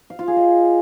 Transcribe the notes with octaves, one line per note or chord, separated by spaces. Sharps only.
F5
F4
G#4
D#5